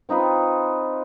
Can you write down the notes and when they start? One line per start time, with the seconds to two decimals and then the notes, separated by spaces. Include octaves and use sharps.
0.09 C4 D#4 F4 B4